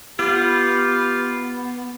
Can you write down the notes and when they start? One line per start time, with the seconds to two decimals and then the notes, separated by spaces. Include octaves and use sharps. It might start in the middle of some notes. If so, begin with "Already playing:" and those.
0.19 B3 F4 G4